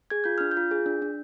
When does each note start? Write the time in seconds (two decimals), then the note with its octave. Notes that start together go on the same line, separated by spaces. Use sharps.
0.10 G#4 G#6
0.24 F4 G6
0.38 D4 F6
0.51 G6
0.57 F4
0.71 G#4
0.86 D4
1.02 D4